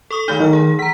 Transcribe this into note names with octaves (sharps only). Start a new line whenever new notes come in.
A4 C#6 D#6
D#3 A3 D#4 G6
D#3 F#3 F6
G#4
E3 A#5 B6